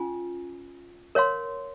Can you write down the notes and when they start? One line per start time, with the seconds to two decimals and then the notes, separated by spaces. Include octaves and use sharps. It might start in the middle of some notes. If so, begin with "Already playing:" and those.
Already playing: C#4 F4 G#5
1.15 A#4 C#5 F5 C6